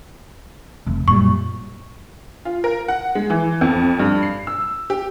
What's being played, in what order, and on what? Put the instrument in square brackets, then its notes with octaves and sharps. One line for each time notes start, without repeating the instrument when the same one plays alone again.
[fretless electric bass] F1
[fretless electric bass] F#2 A#2 G3 [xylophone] C#6
[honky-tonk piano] F4
A#4
F#5
G#3
E3
F2
G2
C7
E6
G4